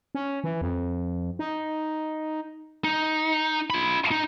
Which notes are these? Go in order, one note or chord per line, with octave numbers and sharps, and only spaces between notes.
C#4
E3
F2
D#4
D#4
F4 B5
D#4